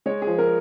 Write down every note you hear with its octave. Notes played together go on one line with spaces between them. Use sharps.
G#3 C#5
F3 G#4
A#4